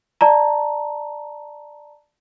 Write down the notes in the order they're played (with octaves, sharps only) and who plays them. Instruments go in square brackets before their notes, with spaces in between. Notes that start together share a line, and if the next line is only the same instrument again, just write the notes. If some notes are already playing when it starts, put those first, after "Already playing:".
[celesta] D5 A5 A#5